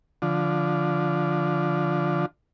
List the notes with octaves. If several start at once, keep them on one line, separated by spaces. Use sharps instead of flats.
D3 F3